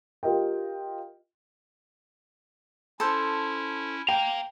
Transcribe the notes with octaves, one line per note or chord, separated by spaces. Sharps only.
F4 G4 A#4 D#5 G5
C#4 E4 A4 C5
F5 G5 A#5